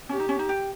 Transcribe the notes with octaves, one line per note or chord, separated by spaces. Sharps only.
C#4 G4
D#4
C#4
D#4
G4